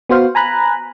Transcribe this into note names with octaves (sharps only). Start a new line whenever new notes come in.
B3 F#4 C5 F5
G#5 A#5 B5 F#6